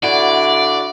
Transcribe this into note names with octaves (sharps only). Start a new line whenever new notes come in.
D3 E4 F#4 D5